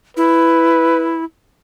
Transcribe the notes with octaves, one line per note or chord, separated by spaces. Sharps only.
E4 B4